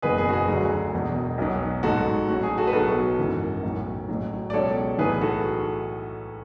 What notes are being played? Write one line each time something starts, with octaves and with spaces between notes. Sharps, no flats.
F#1 E2 B2 F#3 G#4 B4
G#4
F#4
G#4
D2 D3 F#3
E1 E2 B2
B1 B2 F#3
A1 G#2 F#3 F#4 A4
A1 A2 F#3 F#4
G#4
F#4 A4
B4
B1 B2 F#3 F#4 A4
G#1 F#2 E3
B1 A2 F#3
A1 A2 F#3
D5
C#2 B2 F#3 A4 C#5
B1 A2 E3 G#4 B4
F#4 A4